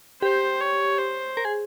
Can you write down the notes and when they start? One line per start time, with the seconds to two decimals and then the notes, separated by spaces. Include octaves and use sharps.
0.22 G4 C5
0.60 C#5
0.99 C5
1.37 A#4
1.45 G#4